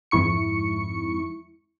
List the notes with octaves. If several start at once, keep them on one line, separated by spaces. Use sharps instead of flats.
F2 G#2 E4 C#6 C#7